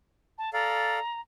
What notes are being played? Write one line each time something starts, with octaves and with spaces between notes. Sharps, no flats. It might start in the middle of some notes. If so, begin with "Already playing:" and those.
A5
A4 D5 F5 A#5